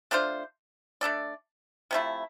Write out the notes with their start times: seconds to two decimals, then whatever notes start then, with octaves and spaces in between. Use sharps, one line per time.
0.11 A3 D4 F4 C5
1.01 A3 D4 A4 D5
1.91 C3 F3 A3 E4